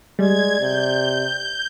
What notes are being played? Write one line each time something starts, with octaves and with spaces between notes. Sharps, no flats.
G3 G#3 D5 G#6
C3 G6